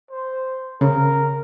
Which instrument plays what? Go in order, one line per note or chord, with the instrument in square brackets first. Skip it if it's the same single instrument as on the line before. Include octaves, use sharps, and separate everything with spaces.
[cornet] C5
[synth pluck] C#3 [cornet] A#4